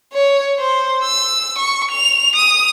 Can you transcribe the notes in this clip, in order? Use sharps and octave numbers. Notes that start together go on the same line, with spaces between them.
C#5
C5
E6
C#6
F7
D#6